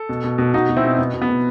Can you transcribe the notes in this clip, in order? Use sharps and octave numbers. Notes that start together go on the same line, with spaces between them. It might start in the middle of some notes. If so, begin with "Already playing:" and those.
Already playing: A4
B2
B2
B2
B2 D#4 F#4
B2
C4 E4
B2
B2 B3
B2
B3
B2